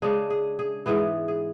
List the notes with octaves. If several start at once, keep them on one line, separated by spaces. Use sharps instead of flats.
C#3 G#3 D4 G#4
G#4
G#4
G#2 E3 B3 G#4
G#4